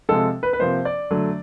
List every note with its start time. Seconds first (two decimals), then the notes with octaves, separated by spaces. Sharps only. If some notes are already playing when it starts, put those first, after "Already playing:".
0.09 C3 F3 G#3 A4
0.43 B4
0.53 B4
0.59 C3 F3 A#3 C5
0.85 D5
1.11 D3 F#3 A3